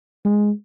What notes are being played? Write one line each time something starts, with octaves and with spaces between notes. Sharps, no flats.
G#3